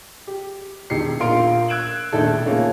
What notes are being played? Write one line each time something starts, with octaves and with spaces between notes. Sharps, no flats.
G4
E1 D#3 G4 C7 C#7
A#1 F4 A#4 F5 C6 D7
E6 F#6 G#6 D7 E7 F#7
E1 A#1 D#3 A3 A4
C#3 A#3 F4 C#5